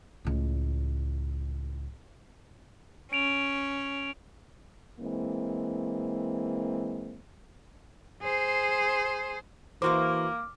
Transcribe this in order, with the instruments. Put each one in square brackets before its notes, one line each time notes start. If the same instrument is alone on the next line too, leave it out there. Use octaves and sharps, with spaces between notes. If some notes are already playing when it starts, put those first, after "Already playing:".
[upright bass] C#2 A2
[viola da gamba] C#4 [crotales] D7 F7
[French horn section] E3 G#3 A#3 C4
[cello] G#4 C5
[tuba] E3 [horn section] A#3 [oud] E4 F#4 C5 [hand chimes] D6 F6